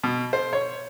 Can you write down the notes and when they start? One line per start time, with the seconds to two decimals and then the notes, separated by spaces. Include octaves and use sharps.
0.04 B2
0.33 C5
0.53 C#5